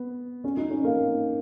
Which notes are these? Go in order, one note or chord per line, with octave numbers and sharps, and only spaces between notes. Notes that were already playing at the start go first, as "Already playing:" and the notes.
Already playing: B3
C#4
D#4
C#4
A#3